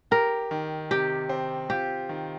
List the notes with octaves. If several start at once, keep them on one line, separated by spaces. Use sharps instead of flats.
G4 A#4
D#3
C3 G4
C4
F4 G4
D#3